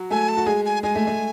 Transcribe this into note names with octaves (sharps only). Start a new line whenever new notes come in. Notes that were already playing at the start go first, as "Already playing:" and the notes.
Already playing: F#3 F#4
A3 A4 G#5
A5
F#4
G#3 G#4 G#5
G#5
G#3 G#4 G#5
A3
A3